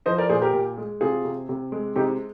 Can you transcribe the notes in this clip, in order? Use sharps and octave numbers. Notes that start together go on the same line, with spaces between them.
F3 C5 D#5
A#4 D5
A#2 G#4 C5
G4 A#4
A#2
G#3
C3 F4 G#4
C3
C3
G#3
C3 D#4 G4